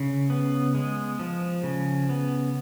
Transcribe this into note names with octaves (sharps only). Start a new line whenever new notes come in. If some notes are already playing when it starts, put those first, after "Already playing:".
Already playing: C#3
B3
G#3
F3
C#3
B3